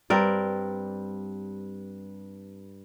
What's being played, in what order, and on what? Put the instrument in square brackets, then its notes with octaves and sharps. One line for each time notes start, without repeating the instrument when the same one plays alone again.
[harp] G2 [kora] C4 A#4 D5